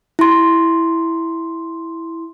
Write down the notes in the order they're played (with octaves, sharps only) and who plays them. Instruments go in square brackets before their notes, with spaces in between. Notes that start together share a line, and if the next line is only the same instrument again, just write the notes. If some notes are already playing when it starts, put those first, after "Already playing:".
[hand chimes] E4 C6